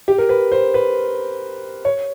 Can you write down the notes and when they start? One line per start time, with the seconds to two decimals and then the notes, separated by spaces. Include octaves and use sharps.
0.08 G4
0.18 A#4
0.29 B4
0.52 C5
0.74 B4
1.85 C#5